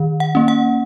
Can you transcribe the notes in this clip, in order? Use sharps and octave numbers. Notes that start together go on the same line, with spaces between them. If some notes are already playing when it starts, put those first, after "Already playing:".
Already playing: D#3
F#5
A#3 C#4
F#5